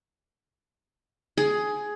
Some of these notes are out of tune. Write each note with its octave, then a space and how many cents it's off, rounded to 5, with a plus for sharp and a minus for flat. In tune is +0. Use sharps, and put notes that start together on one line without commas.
G#4 +10